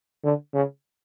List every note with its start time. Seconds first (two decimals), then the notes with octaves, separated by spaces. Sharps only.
0.24 D3
0.54 C#3